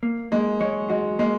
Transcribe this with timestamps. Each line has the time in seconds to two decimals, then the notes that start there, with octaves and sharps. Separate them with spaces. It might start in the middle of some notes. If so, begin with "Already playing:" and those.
0.03 A#3
0.32 G#3 A#3
0.60 G#3 C#5
0.90 G#3 F#4
1.19 G#3 A#3